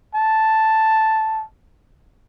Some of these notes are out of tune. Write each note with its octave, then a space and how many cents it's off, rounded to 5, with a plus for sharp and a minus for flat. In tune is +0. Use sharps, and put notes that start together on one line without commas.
A5 +0